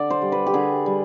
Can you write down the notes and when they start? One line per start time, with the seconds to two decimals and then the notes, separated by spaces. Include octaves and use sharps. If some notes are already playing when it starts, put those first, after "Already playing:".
Already playing: D3 D5
0.10 C5
0.22 G3
0.32 B4
0.47 G4
0.54 D3 G#4
0.86 G3